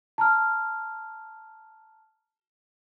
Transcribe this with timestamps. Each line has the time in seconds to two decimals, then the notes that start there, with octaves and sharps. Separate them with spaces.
0.18 A5 A#5 F6